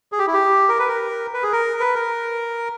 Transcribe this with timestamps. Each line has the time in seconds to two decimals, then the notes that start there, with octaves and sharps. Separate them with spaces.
0.12 G#4
0.19 G4
0.27 E4
0.34 G4
0.69 A#4
0.79 B4
0.89 A#4
1.34 B4
1.43 G#4
1.53 A#4
1.80 B4
1.95 A#4